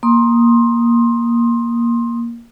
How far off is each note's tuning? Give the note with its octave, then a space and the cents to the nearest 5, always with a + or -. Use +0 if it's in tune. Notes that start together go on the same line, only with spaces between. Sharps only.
A#3 +10 C6 +20 D#6 +0